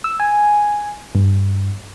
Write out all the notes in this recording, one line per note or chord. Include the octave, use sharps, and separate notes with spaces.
E6
G#5
G2